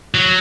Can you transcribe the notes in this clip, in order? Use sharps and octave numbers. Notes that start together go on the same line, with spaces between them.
F#3